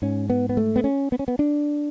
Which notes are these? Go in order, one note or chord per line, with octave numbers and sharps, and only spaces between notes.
G#2 C#4
B3
B3
A3
B3
C#4
B3
C#4
B3
D4